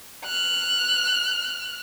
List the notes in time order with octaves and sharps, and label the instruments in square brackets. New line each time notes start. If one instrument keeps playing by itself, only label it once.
[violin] F6 F#6